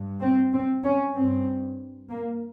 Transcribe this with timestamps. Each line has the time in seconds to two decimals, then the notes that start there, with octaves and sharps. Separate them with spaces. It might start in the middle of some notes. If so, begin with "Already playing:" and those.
Already playing: G2
0.21 C4
0.53 C4
0.83 C#4
1.16 G2 C4
2.09 A#3